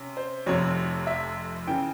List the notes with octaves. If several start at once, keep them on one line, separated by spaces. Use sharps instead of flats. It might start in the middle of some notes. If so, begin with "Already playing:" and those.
Already playing: C3 C#4
C5
F1 F2 C3 C#5
E5
C#3 E3 G5